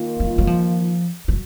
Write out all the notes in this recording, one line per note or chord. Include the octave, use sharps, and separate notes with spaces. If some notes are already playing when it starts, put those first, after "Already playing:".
Already playing: D#3 A#3 F4
F#3
F#3
F3
F#3